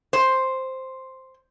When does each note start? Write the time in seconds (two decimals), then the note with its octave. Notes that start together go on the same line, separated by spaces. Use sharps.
0.13 C5